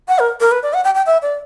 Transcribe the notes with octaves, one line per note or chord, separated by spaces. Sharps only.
F#5
A#4
A#4
B4
D5
F#5
G5
G5
E5
D5